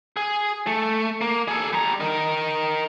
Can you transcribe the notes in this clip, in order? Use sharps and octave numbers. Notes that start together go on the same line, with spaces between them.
G#4
A3
A#3
G#4 A4
G3 A#5
A#4 D#5